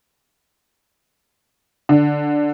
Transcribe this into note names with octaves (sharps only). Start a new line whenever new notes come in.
D3